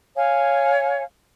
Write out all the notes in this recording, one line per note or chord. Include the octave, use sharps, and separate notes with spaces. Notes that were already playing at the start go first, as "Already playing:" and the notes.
C#5 F5 G#5